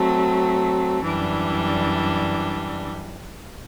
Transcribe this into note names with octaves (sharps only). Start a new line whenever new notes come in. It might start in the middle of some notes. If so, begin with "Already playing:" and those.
Already playing: F#3 A3 C4
F#2 E3 G3 D4